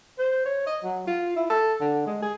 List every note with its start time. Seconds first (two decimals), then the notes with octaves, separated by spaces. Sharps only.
0.19 C5
0.45 C#5
0.66 D#5
0.83 F#3
1.07 F4
1.36 E4
1.50 A4
1.80 D3
2.06 G#3
2.22 G#4